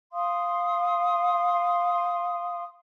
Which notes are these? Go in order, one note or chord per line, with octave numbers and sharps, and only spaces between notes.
F5 C6 D#6